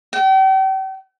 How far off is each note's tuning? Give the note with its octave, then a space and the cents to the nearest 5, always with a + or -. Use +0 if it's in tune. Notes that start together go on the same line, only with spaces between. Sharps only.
G5 -40